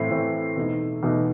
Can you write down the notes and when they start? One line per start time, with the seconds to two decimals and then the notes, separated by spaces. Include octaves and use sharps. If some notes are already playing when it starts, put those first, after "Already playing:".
Already playing: A2 E3 A3 C4 C7
0.11 A2 E3 A3 C4
0.57 E2 B2 A3 D#4
1.03 E2 B2 A3 D#4